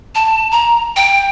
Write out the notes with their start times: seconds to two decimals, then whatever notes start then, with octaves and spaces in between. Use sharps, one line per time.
0.15 A5
0.51 A#5
0.96 G5